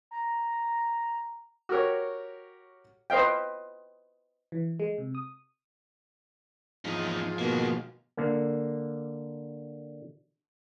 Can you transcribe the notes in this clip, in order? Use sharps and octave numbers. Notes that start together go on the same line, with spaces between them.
A#5
F#4 G4 A#4 C#5
B4 C5 D#5 F5 G5
E3
G#3
C3
D#6
E2 G#2 F3 D#4
B2 D#3 A#3
D3 A#3